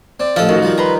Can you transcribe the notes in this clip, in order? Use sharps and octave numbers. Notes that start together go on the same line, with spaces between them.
C4 D5
A1 F3 A4 D#5
D#3 F#4
F3 G3
B4 A#5 C6